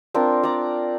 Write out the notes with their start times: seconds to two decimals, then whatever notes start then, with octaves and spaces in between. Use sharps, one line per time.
0.14 C4 D4 F4 A#4
0.43 D5 A#5